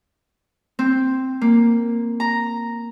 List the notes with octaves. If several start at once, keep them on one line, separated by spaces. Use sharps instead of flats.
C4
A#3
A#5